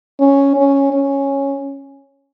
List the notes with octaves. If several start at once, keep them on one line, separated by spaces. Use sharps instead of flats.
C#4
C#4
C#4